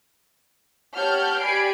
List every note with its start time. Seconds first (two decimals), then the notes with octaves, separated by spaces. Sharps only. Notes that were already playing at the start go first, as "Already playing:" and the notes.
0.96 G4 C#5 F#5 A5 F6 G6
1.42 G4 D5 G#5 B5 C7 D7